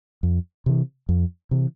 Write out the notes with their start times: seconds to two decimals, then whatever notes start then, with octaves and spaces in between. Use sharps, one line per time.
0.23 F2
0.66 C3 E3
1.09 F2
1.51 C3 E3